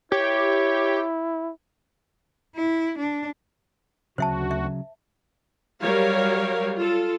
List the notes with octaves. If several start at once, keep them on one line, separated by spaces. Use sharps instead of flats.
E4 G4 C#5
E4
D4
D2 C#3 F#3 F#4 C5 E5 A5
E5
F#3 G3 A#4 C#5 F5
F4 A4